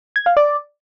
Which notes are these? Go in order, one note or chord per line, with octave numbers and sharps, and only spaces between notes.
G#6
F5
D5